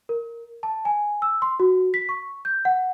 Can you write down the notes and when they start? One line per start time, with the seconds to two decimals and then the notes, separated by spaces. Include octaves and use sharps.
0.09 A#4
0.63 A5
0.85 G#5
1.22 E6
1.42 C6
1.60 F#4
1.94 B6
2.09 C#6
2.45 G6
2.65 F#5